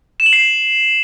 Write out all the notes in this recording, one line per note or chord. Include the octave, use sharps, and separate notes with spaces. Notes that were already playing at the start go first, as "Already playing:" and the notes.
E7
F#7
C7